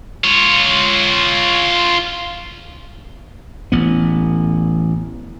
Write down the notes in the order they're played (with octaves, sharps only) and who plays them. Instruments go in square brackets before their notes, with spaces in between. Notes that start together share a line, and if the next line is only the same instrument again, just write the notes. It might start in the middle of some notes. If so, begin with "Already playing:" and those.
[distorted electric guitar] F4 C#5
[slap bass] A1 B3